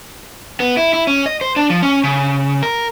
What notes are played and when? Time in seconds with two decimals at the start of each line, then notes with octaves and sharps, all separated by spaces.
0.60 B3
0.77 E4
0.93 E4
1.07 C#4
1.26 D#5
1.41 C5
1.56 D4
1.70 F3
1.82 C#4
2.04 C#3
2.63 A#4